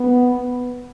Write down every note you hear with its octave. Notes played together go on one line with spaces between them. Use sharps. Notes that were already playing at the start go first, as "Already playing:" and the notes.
Already playing: B3